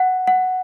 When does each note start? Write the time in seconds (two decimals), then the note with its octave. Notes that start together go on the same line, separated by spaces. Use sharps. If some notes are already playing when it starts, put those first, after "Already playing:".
Already playing: F#5
0.27 F#5